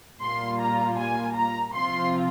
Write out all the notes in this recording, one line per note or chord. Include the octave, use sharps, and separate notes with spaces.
A#2 G3 A#3 F4 C6
A#5
G#5
A#5
C3 F3 C4 F4 C6